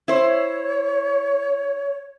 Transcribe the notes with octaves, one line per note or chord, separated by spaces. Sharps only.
E4 C5 C#5